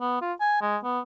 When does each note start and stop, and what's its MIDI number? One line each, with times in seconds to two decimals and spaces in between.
0.01 0.19 59
0.22 0.33 65
0.40 0.60 80
0.61 0.77 56
0.84 1.00 59